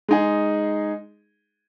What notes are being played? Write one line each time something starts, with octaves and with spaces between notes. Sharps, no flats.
G#3 D#4 G#4